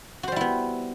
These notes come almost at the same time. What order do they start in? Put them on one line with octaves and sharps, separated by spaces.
F#4 C5 G3 E4 B3